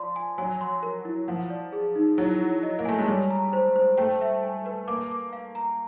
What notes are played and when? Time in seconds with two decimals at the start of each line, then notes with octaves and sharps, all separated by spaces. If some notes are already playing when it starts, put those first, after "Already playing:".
Already playing: F3 D5 C6
0.16 G#5
0.38 F#3 G#5
0.61 C6
0.83 A#4
1.05 E4
1.28 F3 F#5
1.50 D5
1.73 G#4
1.96 D#4
2.18 F#3 E4
2.40 E4
2.63 D#5
2.79 A#3
2.85 A3 G#5
2.98 G#3
3.08 G3 C#5
3.30 A#5
3.53 C5
3.76 C5
3.98 A3 G5
4.21 E5
4.43 G#5
4.66 B4
4.88 A#3 D6
5.11 D6
5.33 F5
5.55 A#5